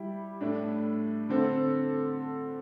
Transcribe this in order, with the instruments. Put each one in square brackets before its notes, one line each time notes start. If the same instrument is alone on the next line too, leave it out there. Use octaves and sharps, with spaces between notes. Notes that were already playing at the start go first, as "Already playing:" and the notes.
Already playing: [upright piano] G3 E4 G4
A2 A3 D4
D3 C4 A4